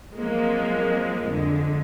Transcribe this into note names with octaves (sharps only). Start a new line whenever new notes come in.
F3 F#3 G#3 A#3 C4
F2 D3 G#3